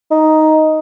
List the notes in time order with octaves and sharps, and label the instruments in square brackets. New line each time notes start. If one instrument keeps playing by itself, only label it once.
[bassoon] D#4